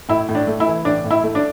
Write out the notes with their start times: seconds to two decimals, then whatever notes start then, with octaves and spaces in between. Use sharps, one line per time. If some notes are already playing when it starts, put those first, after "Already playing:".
0.09 A2 E4
0.29 A2
0.35 D4
0.47 A3
0.60 E4
0.67 E3
0.85 A2 D4
1.04 A2
1.10 E4
1.23 A3
1.35 D4